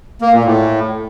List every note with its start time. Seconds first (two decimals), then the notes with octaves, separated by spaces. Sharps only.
0.21 A#3
0.33 A#2
0.45 A2